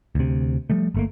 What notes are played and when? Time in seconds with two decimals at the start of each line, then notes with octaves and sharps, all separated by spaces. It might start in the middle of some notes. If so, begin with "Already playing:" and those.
0.15 D2 C3
0.70 F3 G3 A3
0.94 G1 A3 A#3